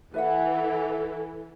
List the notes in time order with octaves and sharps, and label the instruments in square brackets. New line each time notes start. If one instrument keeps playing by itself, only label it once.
[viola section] E3 A4 [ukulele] B4 E5 F#5